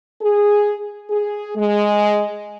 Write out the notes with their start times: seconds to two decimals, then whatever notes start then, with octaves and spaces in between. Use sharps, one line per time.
0.22 G#4
1.10 G#4
1.56 G#3